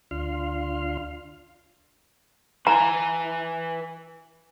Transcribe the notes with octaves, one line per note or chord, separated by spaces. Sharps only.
D2 D4 F4 C6 F6
E3 G#5 A#5